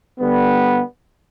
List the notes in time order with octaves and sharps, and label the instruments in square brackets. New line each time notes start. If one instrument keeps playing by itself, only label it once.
[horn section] D3 G3 B3